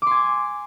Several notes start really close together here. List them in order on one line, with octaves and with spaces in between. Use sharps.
D6 C6 G#5